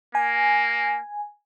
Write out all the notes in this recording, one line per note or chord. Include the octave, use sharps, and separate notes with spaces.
A#3 G#5